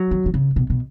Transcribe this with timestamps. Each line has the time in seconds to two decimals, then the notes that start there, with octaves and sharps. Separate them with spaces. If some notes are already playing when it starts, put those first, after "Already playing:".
Already playing: F#3
0.11 D#3
0.26 D#3
0.34 C#3
0.56 B2
0.70 B2